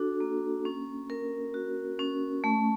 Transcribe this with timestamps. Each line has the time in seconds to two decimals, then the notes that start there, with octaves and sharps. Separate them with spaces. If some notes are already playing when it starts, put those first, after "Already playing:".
Already playing: D4 F#4 A4
0.20 A#3
0.65 C#4
1.10 A#4
1.54 F#4
1.99 C#4
2.44 A3